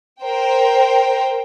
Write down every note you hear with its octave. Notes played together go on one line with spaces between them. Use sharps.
A#4 C5 G5